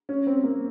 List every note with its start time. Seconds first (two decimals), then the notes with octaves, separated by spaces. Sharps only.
0.09 C#4
0.27 C4
0.44 A#3